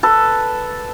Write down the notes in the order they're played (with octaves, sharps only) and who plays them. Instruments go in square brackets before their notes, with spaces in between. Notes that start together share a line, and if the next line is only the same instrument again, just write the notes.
[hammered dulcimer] A4 B4